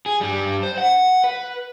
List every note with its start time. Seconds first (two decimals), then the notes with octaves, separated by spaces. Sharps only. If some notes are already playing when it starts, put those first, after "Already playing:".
0.06 G#4
0.21 G2 G3
0.63 C5
0.78 F#5
1.24 B4